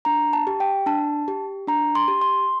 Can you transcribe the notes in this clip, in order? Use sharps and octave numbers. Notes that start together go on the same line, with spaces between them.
D4 A#5
A5
G4
G5
D4 A5
G4
D4 A#5
C6
G4
C6